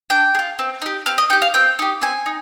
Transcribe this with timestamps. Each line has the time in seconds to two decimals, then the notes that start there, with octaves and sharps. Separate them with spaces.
0.10 D4 G5
0.35 G#4
0.39 F4
0.59 C4
0.82 D#4 G4
1.06 C4 F5
1.18 D#5
1.30 D#4 G5
1.33 G4
1.42 F5
1.54 C4 G5
1.79 D#4 G4
2.02 C4 G#5
2.26 D#4